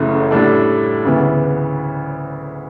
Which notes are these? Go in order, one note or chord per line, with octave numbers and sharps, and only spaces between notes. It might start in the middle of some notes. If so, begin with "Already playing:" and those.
Already playing: F#1 F#2 C#3 E3 A3
A2 G3 D4 A4
D2 C#3 E3 B3